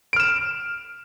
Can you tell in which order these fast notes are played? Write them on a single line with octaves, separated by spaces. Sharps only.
D7 F6 E7